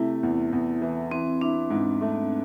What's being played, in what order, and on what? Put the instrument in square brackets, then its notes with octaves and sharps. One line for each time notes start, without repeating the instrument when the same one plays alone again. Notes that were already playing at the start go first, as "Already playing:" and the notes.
Already playing: [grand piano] C3 A3 [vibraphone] E4
[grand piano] E2
E2
E3
[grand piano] E3 [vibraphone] C4
[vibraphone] D4 [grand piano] E4
[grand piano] G#2
A3